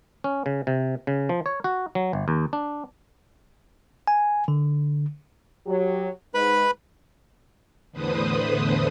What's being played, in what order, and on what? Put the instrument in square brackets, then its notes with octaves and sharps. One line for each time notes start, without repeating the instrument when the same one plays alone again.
[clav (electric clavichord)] C#4
C#3
C3
C#3
F3
C#5
F#4
F#3
G1
D#2
D4
[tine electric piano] G#5
D3
[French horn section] F#3 G4
[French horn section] G#2 [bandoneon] B4 B5
[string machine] E2 A2 D3 B4 C5 D#6